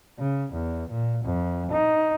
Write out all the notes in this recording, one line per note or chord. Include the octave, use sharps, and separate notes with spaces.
C#3
E2
A#2
F2
D#4